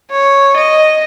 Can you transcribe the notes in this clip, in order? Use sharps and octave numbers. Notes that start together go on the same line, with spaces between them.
C#5
D#5